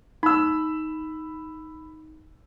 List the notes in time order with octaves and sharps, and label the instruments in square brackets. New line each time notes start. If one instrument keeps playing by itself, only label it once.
[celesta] D#4 [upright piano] B5 E6